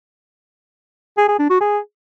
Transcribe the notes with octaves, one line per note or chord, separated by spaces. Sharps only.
G#4
G#4
D4
F#4
G#4